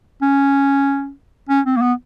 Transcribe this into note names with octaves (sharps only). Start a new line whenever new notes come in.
C#4
C#4
C4
A#3
B3